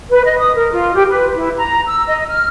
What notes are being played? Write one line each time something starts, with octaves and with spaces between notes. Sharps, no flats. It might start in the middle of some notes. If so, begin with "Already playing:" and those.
B4
D#5
D#6
A#4
F4
G4
B4
E4
A#5
E6
D#5
F6